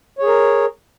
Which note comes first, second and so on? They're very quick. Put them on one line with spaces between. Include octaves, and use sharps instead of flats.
C#5 G#4 A#4